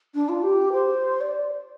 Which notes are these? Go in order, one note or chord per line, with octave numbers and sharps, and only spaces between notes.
D4
F4
G4
C5
D5